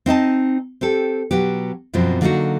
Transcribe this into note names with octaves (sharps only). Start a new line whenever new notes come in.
C4 D#4 D#5 A5
C4 G4 A4
B2 F#3 B3 G4
F#2 B2 F3 F#3 C4
D3 F#3 A#3 D4 D#4 F#4